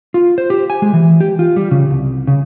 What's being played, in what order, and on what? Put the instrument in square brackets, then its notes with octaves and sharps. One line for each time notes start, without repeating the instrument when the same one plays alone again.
[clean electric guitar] F4
C5
G4
G#5
G#3
E3
G4
F4
G3
C#3
C2
C#3